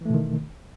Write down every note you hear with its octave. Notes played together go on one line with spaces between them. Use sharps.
B2 D#3 E3 A3